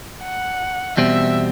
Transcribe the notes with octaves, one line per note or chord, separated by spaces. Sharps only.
F#5
E2 B2 G3 C4 E5